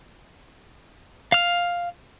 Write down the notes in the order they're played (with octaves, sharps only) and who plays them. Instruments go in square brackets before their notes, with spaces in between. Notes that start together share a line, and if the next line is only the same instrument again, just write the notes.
[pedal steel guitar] F5 F6